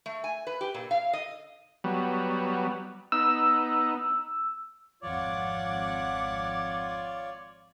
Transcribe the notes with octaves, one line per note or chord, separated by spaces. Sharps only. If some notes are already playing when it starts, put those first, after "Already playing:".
A3
G#5
B4
G4
A#2
F5
D#5
F#3 G3 B3
B3 D#4 E6
G#1 F2 F4 C#5 D5 F#5 D6